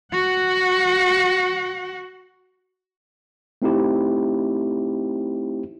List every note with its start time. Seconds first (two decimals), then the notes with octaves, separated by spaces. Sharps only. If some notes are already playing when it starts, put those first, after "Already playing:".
0.12 F#4 F#5
3.62 A3 C4 D#4 E4 G4